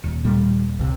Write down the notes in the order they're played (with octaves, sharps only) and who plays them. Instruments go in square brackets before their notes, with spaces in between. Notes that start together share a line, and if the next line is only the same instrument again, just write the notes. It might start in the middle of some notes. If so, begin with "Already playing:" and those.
[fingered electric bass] D#1
[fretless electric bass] A#2 G3 A3
C#2 C3